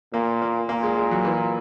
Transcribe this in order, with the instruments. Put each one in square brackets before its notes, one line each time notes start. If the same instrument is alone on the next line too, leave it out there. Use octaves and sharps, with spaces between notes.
[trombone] A#2 [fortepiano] A#3
[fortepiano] A#3
[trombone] A#2 [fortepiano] A#3
[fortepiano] G#3
G#3
F#3
E3